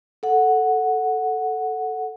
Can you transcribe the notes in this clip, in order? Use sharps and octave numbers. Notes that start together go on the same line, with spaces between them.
A4 F#5